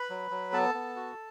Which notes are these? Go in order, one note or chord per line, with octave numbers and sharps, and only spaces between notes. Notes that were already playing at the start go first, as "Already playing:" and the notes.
Already playing: B4 B5
F#3
F#3
B3 A4 A5
B3
F#4